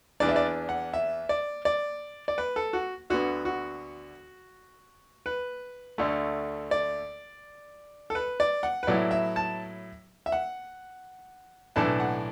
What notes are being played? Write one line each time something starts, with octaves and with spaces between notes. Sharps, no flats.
E2 E3 D4 D5
E5
D5
F#5
E5
D5
D5
D5
B4
A4
F#4
D2 D3 B3 F#4
F#4
B4
D2 D3 A3
D5
A4
B4
D5
F#5
B4
A2 F#3 B3 E4 D5
E5
A5
E5
F#5
B1 A2 E3 D4 A5
F#5